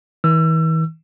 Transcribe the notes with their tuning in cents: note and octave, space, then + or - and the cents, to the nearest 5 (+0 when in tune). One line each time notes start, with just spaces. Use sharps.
E3 -45 E6 +30